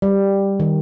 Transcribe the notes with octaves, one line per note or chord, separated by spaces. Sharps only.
G3
D#3